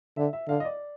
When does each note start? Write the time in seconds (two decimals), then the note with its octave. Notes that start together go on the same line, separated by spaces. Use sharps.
0.17 D3 E5
0.33 E5
0.48 D3 F5
0.60 D#5
0.65 D5